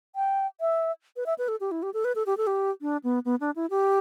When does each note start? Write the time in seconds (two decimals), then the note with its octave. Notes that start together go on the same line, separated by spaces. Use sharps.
0.16 G5
0.61 E5
1.16 B4
1.26 E5
1.38 B4
1.48 A4
1.61 G4
1.71 E4
1.83 G4
1.94 A4
2.05 B4
2.15 A4
2.26 G4
2.37 A4
2.47 G4
2.82 D4
3.04 B3
3.25 B3
3.41 D4
3.56 E4
3.70 G4